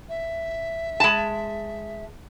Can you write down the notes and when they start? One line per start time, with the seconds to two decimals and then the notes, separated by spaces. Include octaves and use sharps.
0.09 E5
1.00 G#3 A5